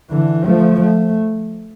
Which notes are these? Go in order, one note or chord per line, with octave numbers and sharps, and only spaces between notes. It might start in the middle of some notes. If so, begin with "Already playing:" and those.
D3 E3
F3 A3
A3